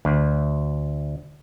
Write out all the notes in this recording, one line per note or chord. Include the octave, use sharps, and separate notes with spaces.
D2